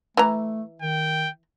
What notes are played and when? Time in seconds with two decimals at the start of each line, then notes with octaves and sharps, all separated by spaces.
0.17 E3 A3 A#5
0.82 D#3 G5